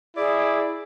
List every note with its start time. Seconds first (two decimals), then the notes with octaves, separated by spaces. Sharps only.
0.17 E4 G#4 D5